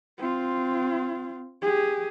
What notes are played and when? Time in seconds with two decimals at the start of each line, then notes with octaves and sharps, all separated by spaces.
0.18 C4 F4
1.62 G4 G#4